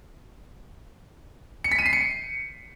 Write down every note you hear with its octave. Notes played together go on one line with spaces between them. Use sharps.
C#7
B6
D#7
C7
C#7